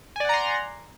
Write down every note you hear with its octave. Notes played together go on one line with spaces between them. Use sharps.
D5 F#5 G#5 A#5 C6